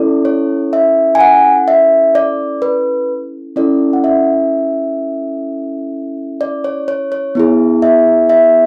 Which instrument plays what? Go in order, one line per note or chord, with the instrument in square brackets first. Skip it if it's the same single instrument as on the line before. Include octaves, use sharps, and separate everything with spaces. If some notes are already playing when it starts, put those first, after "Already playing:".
Already playing: [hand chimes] C#4 E4 A4 D5
C#5
E5
G#5
F#5
E5
D5
B4
C#4 E4 A4 D5
F#5
E5
D5
C#5
C#5
C#5
B3 E4 G#4
E5
E5